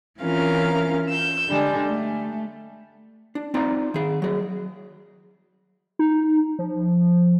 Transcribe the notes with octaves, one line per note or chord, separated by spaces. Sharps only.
E3 C4 C#4 F4 A#4 F5
E6 G6
D3 G3 G#3
A3
D4
C4 D#4 F4 D5 A#5
D#3 G#4
F#3 G#4
D#4
F3